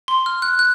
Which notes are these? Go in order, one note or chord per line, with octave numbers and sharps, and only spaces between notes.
C6
F6
F#6
F#6